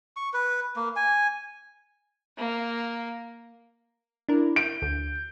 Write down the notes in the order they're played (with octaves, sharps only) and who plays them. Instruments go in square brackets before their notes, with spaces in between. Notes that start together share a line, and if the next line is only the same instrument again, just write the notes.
[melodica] C#6
B4
A#3
G#5
[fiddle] A#3
[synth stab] D4 A#4 [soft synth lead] E4
[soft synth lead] G6 [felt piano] D7
[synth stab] D2